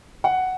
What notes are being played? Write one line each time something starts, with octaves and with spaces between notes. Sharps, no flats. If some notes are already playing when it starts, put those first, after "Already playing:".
F#5